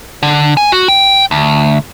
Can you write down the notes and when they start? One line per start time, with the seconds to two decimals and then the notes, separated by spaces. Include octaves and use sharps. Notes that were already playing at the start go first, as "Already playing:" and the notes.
0.23 D3
0.57 G#5
0.72 F#4
0.88 G5
1.31 D2